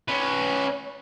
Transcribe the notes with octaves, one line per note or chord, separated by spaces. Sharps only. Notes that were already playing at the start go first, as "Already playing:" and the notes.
C#4 B4